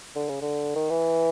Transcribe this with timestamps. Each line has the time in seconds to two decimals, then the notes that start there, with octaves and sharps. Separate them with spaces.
0.16 D3
0.29 C#3
0.42 D3
0.75 D#3
0.90 E3